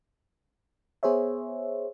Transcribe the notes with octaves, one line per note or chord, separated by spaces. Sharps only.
B3 G#4 C5 C#5 E5